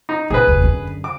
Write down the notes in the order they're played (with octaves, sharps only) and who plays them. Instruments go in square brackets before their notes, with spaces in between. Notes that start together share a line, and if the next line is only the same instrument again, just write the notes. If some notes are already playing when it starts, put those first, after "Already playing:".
[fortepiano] D#4
[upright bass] A#2 [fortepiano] G#4 B4
[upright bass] F1 D#2
F#2 D3
[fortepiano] D6